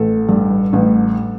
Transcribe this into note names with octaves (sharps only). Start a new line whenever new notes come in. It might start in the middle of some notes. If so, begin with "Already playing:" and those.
Already playing: A1 A4
G2
A1